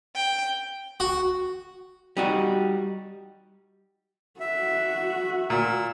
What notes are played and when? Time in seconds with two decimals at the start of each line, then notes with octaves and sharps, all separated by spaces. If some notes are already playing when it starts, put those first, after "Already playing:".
0.16 G5
1.00 F#4
2.17 G3 D#4 F#4
4.40 F#4 E5
5.50 A#2 E6